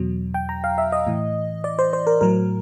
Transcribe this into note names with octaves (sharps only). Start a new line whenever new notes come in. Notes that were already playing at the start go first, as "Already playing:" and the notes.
Already playing: E2 B2 F#3
G5
A#5
F5
E5
D#5
A2 E3
D5
C5
C5
A#4
A2 F#3 A#4